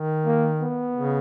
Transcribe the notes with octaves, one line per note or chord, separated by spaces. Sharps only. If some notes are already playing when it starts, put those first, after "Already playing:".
Already playing: D#3
A#3
B3
C#3